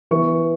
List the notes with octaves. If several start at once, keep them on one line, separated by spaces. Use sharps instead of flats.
E3 B3 C#6